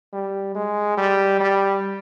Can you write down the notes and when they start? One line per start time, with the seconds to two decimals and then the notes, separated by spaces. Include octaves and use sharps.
0.13 G3
0.55 G#3
0.97 G3
1.40 G3